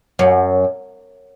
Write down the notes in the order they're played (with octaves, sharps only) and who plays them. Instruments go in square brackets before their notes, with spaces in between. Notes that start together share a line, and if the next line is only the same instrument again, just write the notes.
[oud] F#2